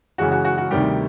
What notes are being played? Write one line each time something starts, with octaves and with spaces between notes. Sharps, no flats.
F#2 C#3 E3 G#3 F#4
F#4
F#4
F#4
D2 C3 D#3 G3 G4